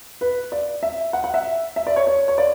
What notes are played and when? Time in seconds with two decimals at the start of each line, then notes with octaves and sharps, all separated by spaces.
0.21 B4
0.52 D5
0.83 E5
1.13 F#5
1.24 F#5
1.34 E5
1.76 E5
1.87 D5
1.96 C#5
2.07 C#5
2.28 C#5
2.38 D5